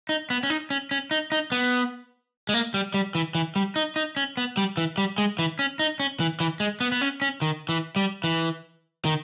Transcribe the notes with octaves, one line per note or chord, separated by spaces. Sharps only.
D#4
B3
C#4
D#4
C#4
C#4
D#4
D#4
B3
G#3
A#3
G3
G3
E3
E3
G3
D#4
D#4
C#4
B3
G3
E3
G3
G#3
E3
C#4
D#4
C#4
E3
E3
G#3
B3
B3
C#4
C#4
D#3
E3
G3
E3
D#3